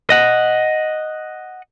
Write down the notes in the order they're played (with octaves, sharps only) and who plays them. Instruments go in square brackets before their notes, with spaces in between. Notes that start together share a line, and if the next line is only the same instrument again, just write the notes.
[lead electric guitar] D#5 F#5